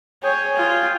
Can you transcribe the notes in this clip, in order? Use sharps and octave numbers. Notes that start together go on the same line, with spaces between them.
G#4 C#5 G5 G#5
F4